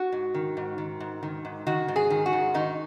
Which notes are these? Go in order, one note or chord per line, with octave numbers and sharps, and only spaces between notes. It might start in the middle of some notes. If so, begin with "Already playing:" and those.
Already playing: F#4
G#2
D#3
G#2
D#3
G#2
D#3
G#2
D#3 F#4
G#2
G#4
D#3
F#4
G#2
D#3 D#4